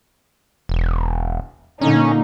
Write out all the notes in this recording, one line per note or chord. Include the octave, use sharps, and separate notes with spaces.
E1
A#2 D3 C#4 D#4